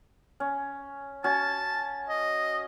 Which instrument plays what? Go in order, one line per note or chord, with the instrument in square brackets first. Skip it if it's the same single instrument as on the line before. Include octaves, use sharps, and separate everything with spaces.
[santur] C#4
[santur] C#4 F#4 [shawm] A5
[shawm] D#5